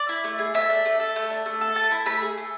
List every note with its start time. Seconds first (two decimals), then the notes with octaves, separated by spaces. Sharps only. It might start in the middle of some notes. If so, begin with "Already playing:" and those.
Already playing: D5
0.09 E4
0.24 A3
0.39 G#4
0.54 A3 E5
0.69 D4
0.86 A3
1.00 A4
1.16 A3
1.30 D4
1.46 A3
1.61 A4
1.75 A3 A5
1.91 E4
2.06 A3 B5
2.22 G#4
2.37 A3